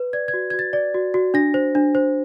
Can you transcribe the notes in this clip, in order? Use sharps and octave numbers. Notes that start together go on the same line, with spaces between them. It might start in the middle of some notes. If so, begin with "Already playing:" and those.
Already playing: B4
D5 G#6
G#6
F#4
F#4 G#6
A6
D5
F#4
F#4
D4 A#6
C5
D4
C5